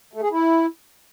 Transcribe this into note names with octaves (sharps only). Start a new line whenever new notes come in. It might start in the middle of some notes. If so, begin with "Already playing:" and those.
A3
G#4
E4